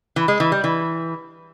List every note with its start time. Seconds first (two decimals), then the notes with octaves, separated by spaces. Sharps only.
0.16 E3
0.28 G#3
0.40 E3
0.52 G3
0.64 E3